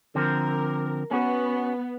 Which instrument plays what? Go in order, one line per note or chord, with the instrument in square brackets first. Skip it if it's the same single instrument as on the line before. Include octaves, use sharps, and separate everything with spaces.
[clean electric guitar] D3 F3 C4 [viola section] A#4
[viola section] B3 [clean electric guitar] C#4 F#4